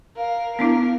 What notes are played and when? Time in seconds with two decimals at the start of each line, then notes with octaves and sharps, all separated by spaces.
0.17 A#4 F5
0.59 B3 D4 E4 A#4